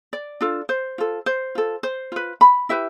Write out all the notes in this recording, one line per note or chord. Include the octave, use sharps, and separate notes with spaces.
D5
D4 F4 A4
C5
F4 A4
C5
F4 A4
C5
F4 B4
B5
E4 G4 B4 E5